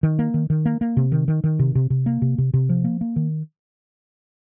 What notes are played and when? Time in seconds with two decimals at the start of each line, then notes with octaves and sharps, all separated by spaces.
0.03 D#3
0.19 A#3
0.34 D#3
0.50 D#3
0.65 A#3
0.81 A#3
0.97 C3
1.12 D#3
1.28 D#3
1.44 D#3
1.59 C3
1.75 C3
1.90 C3
2.06 A#3
2.22 C3
2.38 C3
2.54 C3
2.69 F3
2.84 A#3
3.01 A#3
3.16 D#3